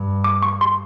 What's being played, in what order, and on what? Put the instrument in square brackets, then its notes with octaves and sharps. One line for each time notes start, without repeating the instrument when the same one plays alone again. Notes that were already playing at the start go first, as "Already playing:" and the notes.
Already playing: [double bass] G2
[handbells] D6
C#6
C6